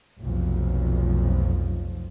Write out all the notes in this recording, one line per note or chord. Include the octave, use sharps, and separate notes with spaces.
F1 B1 F2 F3